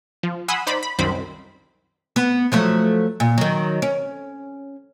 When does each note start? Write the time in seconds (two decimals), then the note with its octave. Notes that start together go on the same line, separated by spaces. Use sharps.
0.23 F3
0.48 F#5 G#5 B5 C6 D#6 E6
0.67 D#4 C5 D5 B5
0.83 B5
0.99 C2 F#2 D#3 C4 C5 B5
2.16 B3
2.52 F3 F#3 A3
3.20 A#2
3.38 D#3 F#3
3.82 C#4